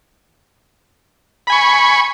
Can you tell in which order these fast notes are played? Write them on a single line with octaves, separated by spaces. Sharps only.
B5 G#5 C#6